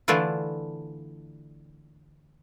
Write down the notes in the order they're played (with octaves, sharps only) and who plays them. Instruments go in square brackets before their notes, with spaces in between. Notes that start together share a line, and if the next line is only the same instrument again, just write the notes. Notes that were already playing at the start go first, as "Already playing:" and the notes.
[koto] D3 E3 A3 D4 E4 F4